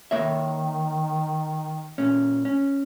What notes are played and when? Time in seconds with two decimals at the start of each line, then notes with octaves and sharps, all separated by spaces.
0.11 D#3 A#3 C#5 E5
1.98 A#2 C#4
2.45 C#4